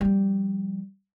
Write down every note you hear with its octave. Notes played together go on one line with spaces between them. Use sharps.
F3 G3